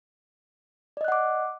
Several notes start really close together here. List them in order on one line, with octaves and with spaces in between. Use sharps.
D5 D#5 F#6 F#5 D6